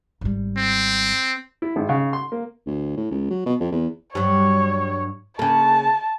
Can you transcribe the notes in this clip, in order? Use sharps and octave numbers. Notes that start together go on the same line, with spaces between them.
G#1 G3
C4
E4
G#1
C#3
C6
A#3
D2
A2
C#2
F#3
B2
F2
E2
G2 F#3 C#5
C#3 A#3 A5